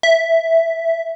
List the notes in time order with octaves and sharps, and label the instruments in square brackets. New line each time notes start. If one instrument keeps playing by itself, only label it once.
[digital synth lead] E5